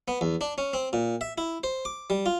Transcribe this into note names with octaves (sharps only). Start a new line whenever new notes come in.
B3
E2
D4
C#4
C4
A#2
E5
E4
C5
D6
G3
F4